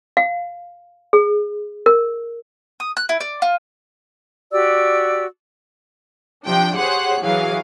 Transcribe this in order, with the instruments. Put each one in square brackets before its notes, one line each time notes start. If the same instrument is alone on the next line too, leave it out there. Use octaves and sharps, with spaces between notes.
[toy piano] F5
G#4
A#4
[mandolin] D#6
F#6
E4
D5
F4
[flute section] F#4 G4 D5 E6
[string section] C3 F3 D4 G5
G4 G#4 C5 C#5 F#5 F#6
E3 F#3 G#4 F5